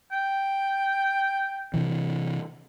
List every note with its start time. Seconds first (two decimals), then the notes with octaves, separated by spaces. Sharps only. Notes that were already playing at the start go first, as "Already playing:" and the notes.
0.12 G5
1.74 C3 E3